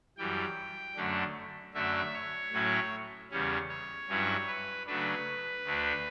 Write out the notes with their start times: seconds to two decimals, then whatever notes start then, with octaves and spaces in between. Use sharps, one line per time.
0.17 F#2 E3 G3 G5
0.96 F#2 D3 A3 D4
1.74 F#2 D3 A3 D4 E5
2.14 C#5
2.52 A2 F#3 C#4 E4
3.31 E2 C#3 G3 C#4
3.69 C#5
4.09 G2 F#3 C#4 E4
4.47 B4
4.86 C#3 F#3 A3 D4 B4
5.65 D2 D3 A3 D4